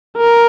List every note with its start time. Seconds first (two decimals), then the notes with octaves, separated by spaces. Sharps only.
0.17 A#4